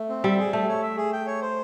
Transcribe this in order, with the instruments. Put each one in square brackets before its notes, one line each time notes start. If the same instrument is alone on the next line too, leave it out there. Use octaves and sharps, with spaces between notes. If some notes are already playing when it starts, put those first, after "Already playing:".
Already playing: [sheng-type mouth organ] A3
C4
[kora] G3 [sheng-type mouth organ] E5
[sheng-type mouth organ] G#4
[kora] A3 [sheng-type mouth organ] G5
[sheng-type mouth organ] C#5
E5
G#4
G5
C#5
C5